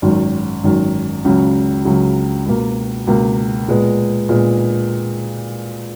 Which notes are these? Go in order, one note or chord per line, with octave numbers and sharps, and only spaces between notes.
G#1 F#2 D#3
G#1 F#2 D#3
C#2 C#3 F#3
C#2 C#3 F#3
C#2 B2 A#3
C#2 B2 A#3
A#2 G#3 B3
A#2 G#3 B3